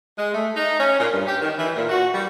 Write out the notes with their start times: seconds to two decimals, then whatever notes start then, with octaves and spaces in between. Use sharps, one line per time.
0.18 G#3
0.34 A3
0.55 D#4
0.78 C#4
0.98 A#2
1.12 G2
1.27 G4
1.42 D#3
1.57 E3
1.76 A#2
1.89 F#4
2.14 G3